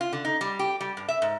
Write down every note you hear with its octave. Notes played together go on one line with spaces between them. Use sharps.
F4
D3
D#4
G3
G4
G3
G2
E5
G#2